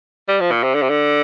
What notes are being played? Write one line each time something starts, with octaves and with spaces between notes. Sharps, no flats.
G3
F3
A#2
C3
D3
C3
D3